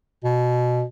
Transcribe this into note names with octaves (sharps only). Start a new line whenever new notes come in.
B2